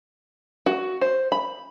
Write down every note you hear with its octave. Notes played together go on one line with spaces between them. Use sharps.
F#4
C5
B5